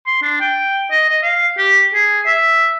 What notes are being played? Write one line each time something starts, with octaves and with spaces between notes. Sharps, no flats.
C6
D4
G5
D#5
D#5
F5
G4
G#4
E5